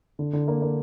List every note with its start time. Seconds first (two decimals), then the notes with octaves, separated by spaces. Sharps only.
0.19 D3
0.33 D3
0.48 A#3
0.62 A#3